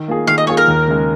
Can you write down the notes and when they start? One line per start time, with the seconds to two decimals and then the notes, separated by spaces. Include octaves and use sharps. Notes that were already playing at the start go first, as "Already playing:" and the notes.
Already playing: D#3
0.08 A#3 F4 G#4
0.27 D#3 F5
0.38 D#5
0.47 A#3 F4 G#4 C#5
0.57 A#4
0.68 D#2
0.88 C#3 G#3